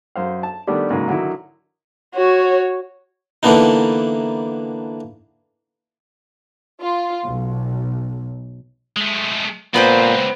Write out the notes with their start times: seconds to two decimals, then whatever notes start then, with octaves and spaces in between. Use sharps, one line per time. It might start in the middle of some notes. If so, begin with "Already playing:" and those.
0.16 F#2 C5 F5
0.43 A5
0.67 D#3 G3 A3 B3 D4 G4
0.90 G#2 C#3 F#3 A#3
1.08 D3 D#3 F#3 D#4 E4
2.15 F#4 C#5
3.43 D3 E3 A#3 B3 D4 D#4
6.81 F4
7.25 B1
8.96 G#3 A3
9.74 C#2 A#2 B3 C4 B4 C5